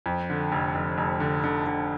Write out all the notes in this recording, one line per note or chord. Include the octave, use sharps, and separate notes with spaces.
F2
D3
F1
F1
F1
D3
D3
D3